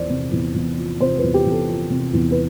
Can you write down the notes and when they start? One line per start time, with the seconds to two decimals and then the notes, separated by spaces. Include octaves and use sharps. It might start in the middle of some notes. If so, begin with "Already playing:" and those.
Already playing: E2 F3 C5 D5
0.10 C3
0.32 E2
0.55 E2
0.77 F3
1.00 C3 C5
1.17 B4
1.23 E2
1.34 G4
1.45 E2
1.51 A4
1.68 F3
1.90 C3
2.13 E2
2.31 B4